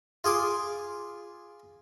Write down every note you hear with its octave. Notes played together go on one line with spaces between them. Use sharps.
F4 G#4 C6 D6